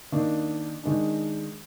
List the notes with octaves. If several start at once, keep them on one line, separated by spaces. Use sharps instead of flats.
D#3 A#3 D4
D#3 G#3 D4